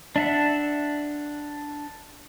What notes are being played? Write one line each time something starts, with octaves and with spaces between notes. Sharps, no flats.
D4 E5 F#5